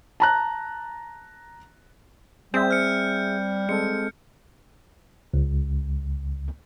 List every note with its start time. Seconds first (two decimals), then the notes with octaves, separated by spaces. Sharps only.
0.20 A5 A#5 F#6
2.54 G3 C4 G#4 E5 G6
2.71 F6 C#7
3.69 G#3 C4 A4 C#7
5.34 C#2